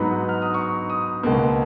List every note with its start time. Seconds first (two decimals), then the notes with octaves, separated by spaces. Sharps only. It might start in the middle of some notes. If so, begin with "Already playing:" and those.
Already playing: G#2 F#3 B3 D#4 B5
0.29 F6
0.42 D#6
0.54 C#6
0.90 D#6
1.23 C#2 B2 A#3